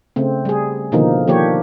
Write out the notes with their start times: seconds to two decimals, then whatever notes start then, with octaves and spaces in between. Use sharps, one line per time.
0.16 C#3 A3 C4
0.45 G3 G#4
0.92 B2 D3 D#3 F3 A#3 D#4
1.28 D#3 F3 A#3 D4 G4 C#5